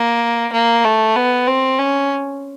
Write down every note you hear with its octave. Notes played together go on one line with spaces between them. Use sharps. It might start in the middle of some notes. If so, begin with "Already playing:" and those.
Already playing: A#3
A#3
A3
B3
C4
C#4